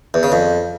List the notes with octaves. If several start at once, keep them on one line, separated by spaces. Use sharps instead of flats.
E2
C#3
F2